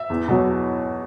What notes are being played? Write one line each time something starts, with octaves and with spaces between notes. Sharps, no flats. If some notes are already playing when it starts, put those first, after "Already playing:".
Already playing: E5
E2
B2 F#3